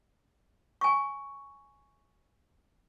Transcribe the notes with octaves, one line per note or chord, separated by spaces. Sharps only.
G#5 C#6